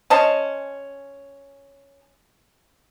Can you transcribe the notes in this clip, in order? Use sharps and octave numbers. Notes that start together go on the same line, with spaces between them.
C#4 C5 D#5 A5